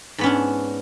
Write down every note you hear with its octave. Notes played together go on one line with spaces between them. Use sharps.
G#2 B3 C#4 D4